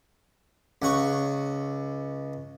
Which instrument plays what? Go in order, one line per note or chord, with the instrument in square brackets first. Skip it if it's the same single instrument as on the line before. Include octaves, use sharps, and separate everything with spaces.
[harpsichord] C#2 F#5 C#6